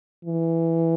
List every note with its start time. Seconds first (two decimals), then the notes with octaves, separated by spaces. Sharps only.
0.25 E3